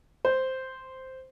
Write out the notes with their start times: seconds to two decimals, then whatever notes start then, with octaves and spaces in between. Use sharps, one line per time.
0.25 C5